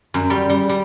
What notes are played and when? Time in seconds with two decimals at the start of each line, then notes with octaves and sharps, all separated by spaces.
0.14 F#2
0.30 G3
0.50 G3
0.69 G3